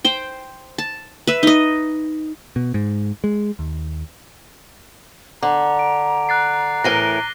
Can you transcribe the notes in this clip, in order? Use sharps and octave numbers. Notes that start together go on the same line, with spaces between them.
C5 G5
A5
B4 E5
D#4 D#5
B2
G#2
G#3
D#2
D3 A#5 D6
D7
F#6 A6 C7
A2 E3 A#4 A#6 D#7 G7